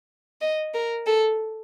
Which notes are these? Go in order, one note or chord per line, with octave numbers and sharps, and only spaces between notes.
D#5
A#4
A4